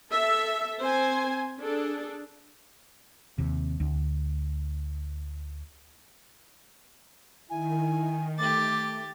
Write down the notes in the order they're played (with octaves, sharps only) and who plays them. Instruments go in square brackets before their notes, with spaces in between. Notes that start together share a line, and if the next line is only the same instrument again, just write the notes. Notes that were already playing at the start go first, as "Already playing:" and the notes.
[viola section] A4 E5
C4 C5 G#5
D4 G#4 A4
[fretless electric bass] D#2 C3
D2
[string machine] D#3 [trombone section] E4 [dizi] G#5
[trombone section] A3 [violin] G4 A6 [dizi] D6